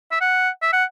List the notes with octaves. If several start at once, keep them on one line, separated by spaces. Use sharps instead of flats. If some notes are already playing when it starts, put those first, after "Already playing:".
E5
F#5
E5
F#5